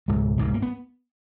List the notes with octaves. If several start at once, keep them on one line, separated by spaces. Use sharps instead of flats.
C#2 G#2 B2 G#3
G#2 G#3
A#3
B3